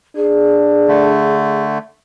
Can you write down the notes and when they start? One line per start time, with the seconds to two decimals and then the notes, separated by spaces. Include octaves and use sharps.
0.16 D4 G#4
0.88 D3 A3